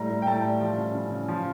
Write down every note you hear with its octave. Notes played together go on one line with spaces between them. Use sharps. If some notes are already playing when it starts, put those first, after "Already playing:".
Already playing: A2 G3 A#5
G3
G5
A2 A5
G3
F3
C#3
C#3
C#3
F3